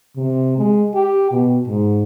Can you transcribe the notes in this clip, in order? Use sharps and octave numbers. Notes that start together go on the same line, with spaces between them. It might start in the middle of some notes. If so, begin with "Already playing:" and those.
C3
G#3
G4
B2
G#2